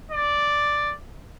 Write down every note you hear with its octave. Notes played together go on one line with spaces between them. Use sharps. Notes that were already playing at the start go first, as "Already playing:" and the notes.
D5